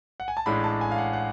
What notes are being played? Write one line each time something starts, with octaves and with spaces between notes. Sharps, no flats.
F#5
G#5
A5
A1 A2 G#3 D4 B5
A5
G#5
F5
F#5
F#5